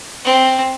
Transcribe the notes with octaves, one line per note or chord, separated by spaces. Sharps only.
C4